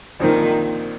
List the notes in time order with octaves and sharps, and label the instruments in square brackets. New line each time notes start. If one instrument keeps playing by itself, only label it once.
[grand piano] A#1 A#2 F3 C4 D#4 [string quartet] D#3